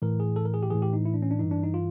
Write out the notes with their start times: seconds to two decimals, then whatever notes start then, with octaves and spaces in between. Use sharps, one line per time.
0.02 A2 E3 A#4
0.20 G#4
0.36 A4
0.45 A#4
0.54 G#4
0.63 G4
0.70 A2 E3 G#4
0.82 G4
0.93 D#4
1.05 E4
1.14 D4
1.22 C#4
1.31 D4
1.39 G2 E3 D#4
1.51 D4
1.63 D#4
1.74 F4